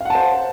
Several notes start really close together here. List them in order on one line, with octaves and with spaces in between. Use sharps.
F5 F#5 A5 C5